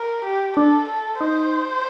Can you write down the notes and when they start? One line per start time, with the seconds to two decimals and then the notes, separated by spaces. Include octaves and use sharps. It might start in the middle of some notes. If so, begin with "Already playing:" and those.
Already playing: A#4
0.25 G4
0.57 D4 A4
0.89 A4
1.21 D#4 C5